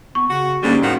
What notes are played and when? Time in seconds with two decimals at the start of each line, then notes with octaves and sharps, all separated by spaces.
0.15 B3 C#6
0.29 C#3 F#4
0.63 G#2 D3 G3 A#3 C#4
0.82 A2 D#3 F3 F#4